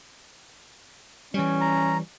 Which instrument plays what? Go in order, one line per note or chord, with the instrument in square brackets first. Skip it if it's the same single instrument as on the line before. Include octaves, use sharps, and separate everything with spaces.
[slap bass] E3 G3 [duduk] C#4
[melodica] A#5